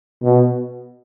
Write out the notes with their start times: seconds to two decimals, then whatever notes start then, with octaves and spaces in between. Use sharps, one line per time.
0.23 B2